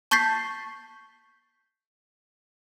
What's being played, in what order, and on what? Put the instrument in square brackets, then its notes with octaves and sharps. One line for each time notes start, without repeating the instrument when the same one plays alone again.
[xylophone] A5 C#6 G6 A6 B6 C7